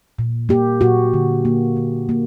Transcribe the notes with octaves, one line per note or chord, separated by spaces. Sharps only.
A#2
A#3 G4
A#2 F#4
D3
A#3
D3
A#3